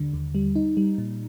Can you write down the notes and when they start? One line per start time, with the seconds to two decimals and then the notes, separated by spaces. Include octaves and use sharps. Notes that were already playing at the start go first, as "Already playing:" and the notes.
Already playing: D#2 D3 G3
0.13 D#2
0.35 G3
0.56 D#4
0.77 G3
0.98 A#2